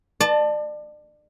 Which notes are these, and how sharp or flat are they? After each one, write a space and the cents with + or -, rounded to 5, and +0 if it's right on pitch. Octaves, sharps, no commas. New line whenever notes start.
D5 +35 A5 +0